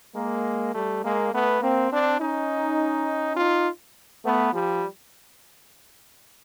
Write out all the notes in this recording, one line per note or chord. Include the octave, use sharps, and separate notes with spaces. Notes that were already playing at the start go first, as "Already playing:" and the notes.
G#3 A#3
G3 A3
G#3 A#3
A3 B3
A#3 C4
C4 D4
C#4 D#4
D#4 F4
A3 B3
F3 G3